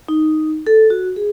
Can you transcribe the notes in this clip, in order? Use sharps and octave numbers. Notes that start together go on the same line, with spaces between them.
D#4
A4
F#4
G#4